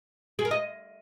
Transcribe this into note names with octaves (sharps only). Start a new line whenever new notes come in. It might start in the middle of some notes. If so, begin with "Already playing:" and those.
G#4
A#4
D#5